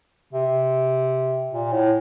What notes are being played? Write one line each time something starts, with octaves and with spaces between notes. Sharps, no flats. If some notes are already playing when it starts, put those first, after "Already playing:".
C3
A#2
A2